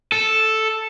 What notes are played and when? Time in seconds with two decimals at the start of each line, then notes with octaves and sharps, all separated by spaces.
0.12 A4